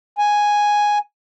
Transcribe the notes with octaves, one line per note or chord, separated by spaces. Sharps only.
G#5